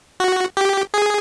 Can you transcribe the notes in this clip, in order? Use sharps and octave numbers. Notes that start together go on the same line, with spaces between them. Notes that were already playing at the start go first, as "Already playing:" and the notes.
F#4
G4
G#4